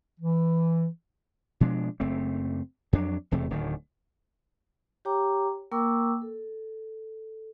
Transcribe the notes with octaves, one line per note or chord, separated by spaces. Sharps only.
E3
B2 F3 G#3 D4
F#1 A3 C4
F2 F#3 D4
E1 E2 C3 A3
D1 D2 A2 D#3
G4 C#5 G5 A#5 D6
A#3 A#4 G5 C#6 D6 E6
A4